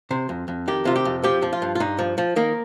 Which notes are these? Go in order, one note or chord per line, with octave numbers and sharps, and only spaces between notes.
C3 C5
F2
F2
D#3 G4
C3 F4
G4
F2
F3 G4
F3
F4
G2
F4
G2 D#4
F3
F3
D#3 A#3